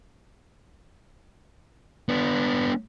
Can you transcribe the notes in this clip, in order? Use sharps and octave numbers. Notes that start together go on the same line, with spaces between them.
B3 D4